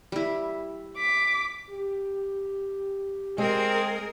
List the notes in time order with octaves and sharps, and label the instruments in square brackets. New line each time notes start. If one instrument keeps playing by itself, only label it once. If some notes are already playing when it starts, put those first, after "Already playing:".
[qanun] G3 E4
[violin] D6 B6
[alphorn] G4
[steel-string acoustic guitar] G#3 [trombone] C4 [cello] G#4 A#4